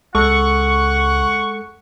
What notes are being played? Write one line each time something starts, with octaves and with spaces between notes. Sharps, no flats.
C#2 G#3 A4 F#5 C#6